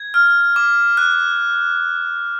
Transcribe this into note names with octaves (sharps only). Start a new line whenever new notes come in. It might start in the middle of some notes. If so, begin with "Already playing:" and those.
Already playing: G#6
F6
D6
F#6